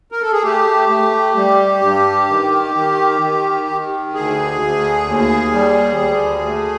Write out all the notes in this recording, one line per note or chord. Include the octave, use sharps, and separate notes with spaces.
A#4
A4
G#4
A3 G4
A3
G3
G2
D#3
D#3
D#3
D#3
D2 G#4
D2
D#2
G3
D2
A3